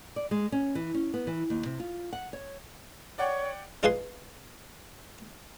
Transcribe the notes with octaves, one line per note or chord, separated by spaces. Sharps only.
D5
G#3
C#4
E3
C#4
B3
E3
D#2
C3
F4
F#5
C#5
C#5 D5 F#5 G5
D#4 F4 G#4 B4 G#5 C6